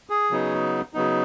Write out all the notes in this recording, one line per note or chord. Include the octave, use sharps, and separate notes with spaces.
G#4
C#3 F#3 B3 D#4
C#3 F#3 B3 D#4